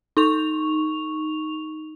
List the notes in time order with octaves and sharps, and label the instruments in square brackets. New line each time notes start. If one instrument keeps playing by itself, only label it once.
[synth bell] D#4 C#6 F7